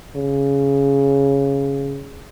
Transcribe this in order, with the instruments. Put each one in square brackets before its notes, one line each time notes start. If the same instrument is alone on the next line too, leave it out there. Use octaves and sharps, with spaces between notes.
[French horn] C#3